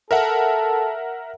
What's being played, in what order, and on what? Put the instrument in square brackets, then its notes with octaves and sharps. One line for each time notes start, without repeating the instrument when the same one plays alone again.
[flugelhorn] A4 [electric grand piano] A#4 E5 F#5